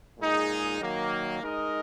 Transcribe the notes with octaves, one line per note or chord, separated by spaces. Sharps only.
A#2 G#3 D#4 G#4
D#3 F#3 A#3
G#3 D#4 A#4 D#5